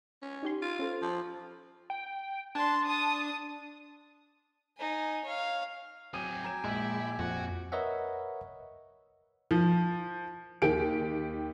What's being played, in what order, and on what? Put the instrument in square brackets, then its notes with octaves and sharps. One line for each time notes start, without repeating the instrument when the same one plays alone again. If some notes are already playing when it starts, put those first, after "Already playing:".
[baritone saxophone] C#4
[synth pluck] D#4 G4 C6
[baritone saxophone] F4
[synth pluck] C#4 A4 C5
[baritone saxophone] F3
[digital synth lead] G5
[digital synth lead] D4 [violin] A5 C6
[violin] A5 D#6
[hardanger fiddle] D#4 G#5
C#5 F5
[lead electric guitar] F#3 C4 [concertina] G5 G#5 D6 [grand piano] D#6 D#7
[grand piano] A#5 G#6 E7
[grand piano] A#1 [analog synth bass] G#3 [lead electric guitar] E4
[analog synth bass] F2 [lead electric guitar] F#4
[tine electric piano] A#4 B4 C#5 D#5 E5 F#5
[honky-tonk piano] F3
D#2 G4 D7